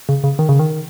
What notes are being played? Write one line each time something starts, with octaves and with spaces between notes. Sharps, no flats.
C#3
C#3
D#3
C#3
D#3